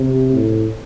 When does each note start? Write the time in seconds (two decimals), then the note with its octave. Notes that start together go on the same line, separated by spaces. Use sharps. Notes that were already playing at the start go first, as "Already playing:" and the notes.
Already playing: C3
0.33 A2